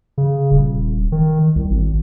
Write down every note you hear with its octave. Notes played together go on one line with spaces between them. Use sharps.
C#3
D#1
D#3
C2
G#1